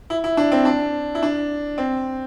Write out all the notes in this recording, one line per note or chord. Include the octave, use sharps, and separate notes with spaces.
E4
E4
D4
C4
D4
E4
D4
C4